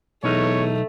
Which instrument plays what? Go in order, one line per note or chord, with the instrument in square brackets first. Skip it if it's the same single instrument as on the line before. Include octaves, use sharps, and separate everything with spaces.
[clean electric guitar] B1 D#4 [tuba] E2 [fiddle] A3 [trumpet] C#5